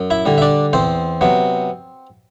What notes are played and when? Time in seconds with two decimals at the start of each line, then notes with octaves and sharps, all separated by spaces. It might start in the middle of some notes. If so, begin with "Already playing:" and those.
Already playing: F#2
0.10 E4 E5
0.25 D3 G3
0.38 E5
0.42 D4 D5
0.73 E2 C4 C5
1.21 C3 F#3 B3